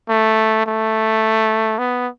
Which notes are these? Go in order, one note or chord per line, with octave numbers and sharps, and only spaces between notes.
A3
A3
B3